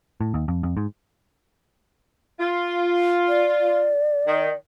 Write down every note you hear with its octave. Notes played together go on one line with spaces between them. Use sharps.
A2
D#2
F2
F2
G#2
F4
D5
D#3